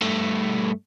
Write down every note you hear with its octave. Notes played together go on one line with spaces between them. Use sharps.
G2 A3